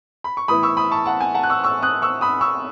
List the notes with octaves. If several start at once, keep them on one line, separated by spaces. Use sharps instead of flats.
B5
C#6
A2 E3 B3 E4 B5 D#6
C#6 E6
B5 D#6
A5 C#6
F#5 A5
G#5
F#5 A5
F#6
C#6 E6
C#6 E6
D#6 F#6
C#6 E6
B5 D#6
C#6 E6